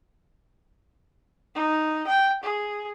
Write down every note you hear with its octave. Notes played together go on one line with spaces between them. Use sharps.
D#4
G5
G#4